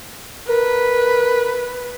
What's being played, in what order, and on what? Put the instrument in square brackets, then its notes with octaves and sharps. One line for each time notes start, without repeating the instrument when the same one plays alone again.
[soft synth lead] A#4 [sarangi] B4